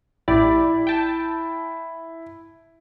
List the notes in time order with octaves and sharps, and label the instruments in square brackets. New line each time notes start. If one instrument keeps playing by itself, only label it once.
[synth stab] A1 G4 D5 [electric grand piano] E4
[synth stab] G5 A5